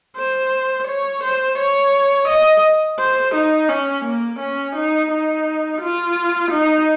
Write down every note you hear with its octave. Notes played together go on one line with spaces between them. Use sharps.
C5
C#5
C5
C#5
D#5
C5
D#4
C#4
A#3
C#4
D#4
D#4
F4
D#4